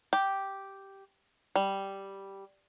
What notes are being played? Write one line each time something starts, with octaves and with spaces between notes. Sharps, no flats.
G4
G3